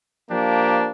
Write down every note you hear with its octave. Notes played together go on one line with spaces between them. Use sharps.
F3 A#3 D4 G4